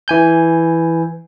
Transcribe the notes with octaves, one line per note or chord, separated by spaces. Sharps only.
E3 G#5 G6